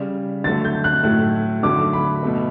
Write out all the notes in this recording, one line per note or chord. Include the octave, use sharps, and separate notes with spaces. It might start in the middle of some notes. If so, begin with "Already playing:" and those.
Already playing: C#3 G3
D3 F#3 A3 A6
G6
F#6
A2 F#3 A3
D3 F#3 A3 D6
B5
B2 A3